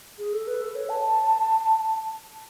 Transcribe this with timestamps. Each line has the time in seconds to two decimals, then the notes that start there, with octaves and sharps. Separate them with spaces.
0.19 G#4
0.33 A4
0.47 B4
0.62 A4
0.75 C#5
0.89 A5